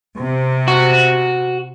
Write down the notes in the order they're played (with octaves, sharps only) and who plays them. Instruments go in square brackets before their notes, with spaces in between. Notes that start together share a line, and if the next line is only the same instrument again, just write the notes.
[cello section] C3
[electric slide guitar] F#4